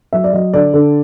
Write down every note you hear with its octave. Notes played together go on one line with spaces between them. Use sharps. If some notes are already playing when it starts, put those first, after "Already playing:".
F#3 E5
D5
F#3 D#5
D3 D5
D3